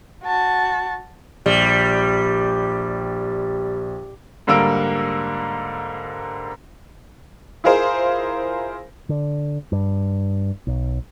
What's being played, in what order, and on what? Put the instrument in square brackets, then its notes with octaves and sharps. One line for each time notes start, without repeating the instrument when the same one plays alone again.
[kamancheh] F#4 A5
[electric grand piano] A#1 [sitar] G3
[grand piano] G#2 D3 G3 A#3 E6 D7
[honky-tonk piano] E4 F4 G#4 A#4 C5
[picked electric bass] D3
G2
B1